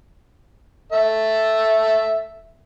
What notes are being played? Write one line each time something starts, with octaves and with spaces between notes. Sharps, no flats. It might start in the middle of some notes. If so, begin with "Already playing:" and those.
A4 E5